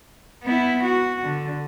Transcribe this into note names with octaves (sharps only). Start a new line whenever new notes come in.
B3 E4
F#4
D3